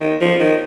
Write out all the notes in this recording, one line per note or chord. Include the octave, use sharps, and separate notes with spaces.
D#3
F3
D#3